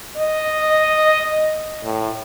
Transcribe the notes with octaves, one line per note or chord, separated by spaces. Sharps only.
D#5
A2